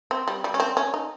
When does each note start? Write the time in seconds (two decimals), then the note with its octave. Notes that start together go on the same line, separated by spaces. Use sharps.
0.11 C4
0.28 G3
0.44 G3
0.54 C#4
0.60 C4
0.77 C#4
0.94 D#4